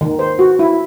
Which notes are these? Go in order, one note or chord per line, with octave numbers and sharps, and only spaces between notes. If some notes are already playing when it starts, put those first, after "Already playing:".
D#3
C5
F#4
E4